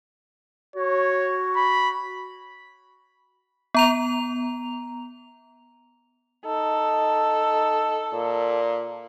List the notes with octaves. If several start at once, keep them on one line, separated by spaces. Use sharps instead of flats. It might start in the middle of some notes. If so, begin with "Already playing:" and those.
F#4 C#5
B5
B3 A#5 F7
D#4 A4
A#2